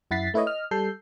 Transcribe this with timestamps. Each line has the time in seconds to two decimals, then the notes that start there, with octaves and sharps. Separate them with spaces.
0.11 F#2 E4 F#5 A6 B6 C7
0.34 A3 E4 B4 C#5 D#5
0.46 D#5 F6
0.71 G3 A4 G6 C7